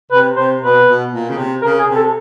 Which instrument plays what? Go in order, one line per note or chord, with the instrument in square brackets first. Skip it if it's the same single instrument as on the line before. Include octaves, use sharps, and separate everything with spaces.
[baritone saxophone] C3 [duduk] B4
[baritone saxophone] C3 [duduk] C5
[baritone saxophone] B2 [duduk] B4
[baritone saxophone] B2
A#2
C#3
C3
[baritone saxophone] C#3 [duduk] A#4
[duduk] G#4
[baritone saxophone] C3
[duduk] A4